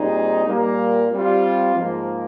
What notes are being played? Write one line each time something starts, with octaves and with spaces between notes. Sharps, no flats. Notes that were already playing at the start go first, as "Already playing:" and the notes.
Already playing: A#2 G3 C4 D#4 G#4
A#2 G3 A#3
G3 C4 F4
G#2 F3 A#3